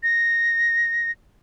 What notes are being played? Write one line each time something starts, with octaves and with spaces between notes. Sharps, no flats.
A#6